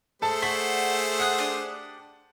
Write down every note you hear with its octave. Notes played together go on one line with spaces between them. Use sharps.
A3 G#4 A4 C5 A5
D5 F#5 C#6 B6
F#5 D#6 F#6
D4 G4 D#6